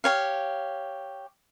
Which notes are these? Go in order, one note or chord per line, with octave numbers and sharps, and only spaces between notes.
G4 C#5 F5